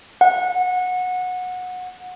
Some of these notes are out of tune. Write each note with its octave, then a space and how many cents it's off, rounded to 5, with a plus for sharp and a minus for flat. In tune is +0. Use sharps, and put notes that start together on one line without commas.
F#5 -20